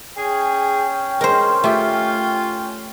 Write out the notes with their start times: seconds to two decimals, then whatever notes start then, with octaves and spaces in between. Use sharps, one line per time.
0.17 C#4 G#4 G5
1.21 G#3 A#4 C5
1.64 A3 F4 G4